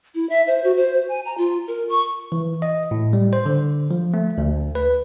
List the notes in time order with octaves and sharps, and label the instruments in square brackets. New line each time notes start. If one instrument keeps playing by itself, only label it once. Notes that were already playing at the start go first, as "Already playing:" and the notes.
[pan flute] E4
E5
C5
F#4
C5
C5
G#5
A#5
F4
A#4
C#6
[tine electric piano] E3
D#5
A2
G3
C5
D3
F3
A3
D2
B4